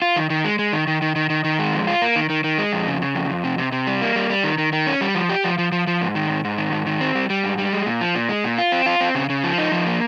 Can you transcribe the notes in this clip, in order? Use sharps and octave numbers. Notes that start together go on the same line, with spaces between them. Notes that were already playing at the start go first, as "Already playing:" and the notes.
F4
D#3
D#3
G#3
G#3
D#3
D#3
D#3
D#3
D#3
D#3
G#3
F2
F4
A#3
D#3
D#3
D#3
G#3
F2
C#3
C#3
F2
F2
C3
C3
C3
G3
A#3
G3
G3
D#3
D#3
D#3
C#4
G3
F3
G4
F3
F3
F3
F3
G#2
D#3
G#2
G#2
D#3
G#2
D#3
C4
G3
G3
G#2
G3
G#3
A#2
F3
A#2
G#3
A#2
F4
C4
F4
C4
C#3
C#3
F3
D#4
F3
A#3